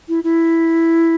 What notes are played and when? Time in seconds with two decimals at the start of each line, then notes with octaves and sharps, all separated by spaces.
0.08 E4
0.24 E4